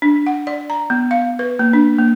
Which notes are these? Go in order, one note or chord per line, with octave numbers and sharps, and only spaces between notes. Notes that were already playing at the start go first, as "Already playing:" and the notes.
D4
F#5
D5
A#5
B3
F5
B4
A#3
D4
A#3